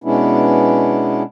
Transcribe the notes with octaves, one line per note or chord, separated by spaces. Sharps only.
B2 G#3 B3 C#4 D4 E4